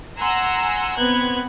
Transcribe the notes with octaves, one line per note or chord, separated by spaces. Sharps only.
F#5 G#5 A#5 C6 E6
B3 C4 F#6 G#6